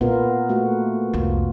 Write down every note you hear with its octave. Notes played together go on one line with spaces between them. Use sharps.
A#2 B3 F4 A#4
A3 A#3 F#4
C2 F2 F4